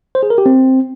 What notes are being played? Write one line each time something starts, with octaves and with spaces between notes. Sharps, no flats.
C5
G#4
A#4
G4
C4